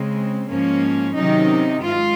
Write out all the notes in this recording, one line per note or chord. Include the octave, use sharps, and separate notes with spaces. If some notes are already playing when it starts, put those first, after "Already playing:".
Already playing: C#3 G#3 C4
G#2 F3 A#3 C#4
C3 D#3 F#3 C#4 D#4
G#2 F4